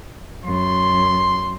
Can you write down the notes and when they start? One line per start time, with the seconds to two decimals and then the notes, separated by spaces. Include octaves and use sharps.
0.44 F#2 C6